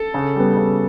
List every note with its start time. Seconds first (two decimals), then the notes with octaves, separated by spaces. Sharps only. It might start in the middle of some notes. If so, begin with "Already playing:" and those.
Already playing: A4
0.14 C#3
0.36 G3 B3
0.57 C#3